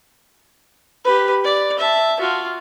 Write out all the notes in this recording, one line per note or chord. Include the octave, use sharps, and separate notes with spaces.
G4 B4
D5
E5 A5
F4 F#4